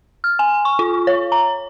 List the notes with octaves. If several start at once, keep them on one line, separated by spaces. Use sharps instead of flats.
F6
G#5
C#6
F4
C#5
A#5